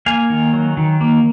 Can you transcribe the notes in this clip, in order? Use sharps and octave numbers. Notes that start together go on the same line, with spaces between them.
A#3 F5 G#5
D#3
F#3
D#3
A#3